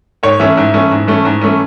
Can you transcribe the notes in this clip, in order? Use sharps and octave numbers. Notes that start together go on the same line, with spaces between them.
G#2 C#5
E3 A3 C#4 E5
G#2
E3 A3 C#4
G#2
E3 A3 C#4
G#2
E3 A3 C#4